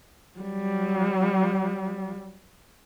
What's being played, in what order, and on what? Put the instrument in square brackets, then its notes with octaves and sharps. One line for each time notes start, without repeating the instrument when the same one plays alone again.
[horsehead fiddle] F#3 G3